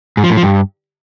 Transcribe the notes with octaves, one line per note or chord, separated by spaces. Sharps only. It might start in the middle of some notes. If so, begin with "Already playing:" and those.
G#2
F3
A2
F3
G2